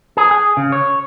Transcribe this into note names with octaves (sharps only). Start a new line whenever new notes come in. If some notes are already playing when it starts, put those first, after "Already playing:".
G#4
G#4
C#3
C#5